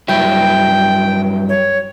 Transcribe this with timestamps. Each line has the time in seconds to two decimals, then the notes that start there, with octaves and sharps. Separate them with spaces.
0.08 G2 F#3 E4 G5
1.49 C#5